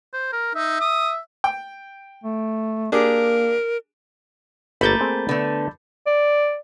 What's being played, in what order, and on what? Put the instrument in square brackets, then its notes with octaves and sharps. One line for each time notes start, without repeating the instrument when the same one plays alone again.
[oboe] C5
A#4
[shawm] D#4 [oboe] E5
[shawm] D#6
[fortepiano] G5
[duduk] A3
[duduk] A#3 [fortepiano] D4 G4 G#4 [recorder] A#4
[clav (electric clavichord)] G1 [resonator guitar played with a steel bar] A3 A#3 [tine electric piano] B5 G6 A6
[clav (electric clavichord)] C4 G#4
[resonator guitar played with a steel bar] D3 A3 [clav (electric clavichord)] B3
[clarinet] D5